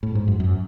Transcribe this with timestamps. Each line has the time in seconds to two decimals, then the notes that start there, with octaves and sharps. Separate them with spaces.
0.03 A2
0.15 G#2
0.28 F#2
0.40 F#2